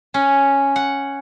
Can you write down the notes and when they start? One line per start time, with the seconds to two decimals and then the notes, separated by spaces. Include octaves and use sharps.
0.14 C#4
0.76 F#5